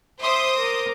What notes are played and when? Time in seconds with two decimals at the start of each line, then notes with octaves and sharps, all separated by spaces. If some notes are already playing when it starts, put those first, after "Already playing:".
0.20 C5 E5 C6 D6 D#6
0.56 A#4 D6